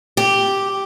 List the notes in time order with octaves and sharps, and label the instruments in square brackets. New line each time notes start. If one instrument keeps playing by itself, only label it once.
[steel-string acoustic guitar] G4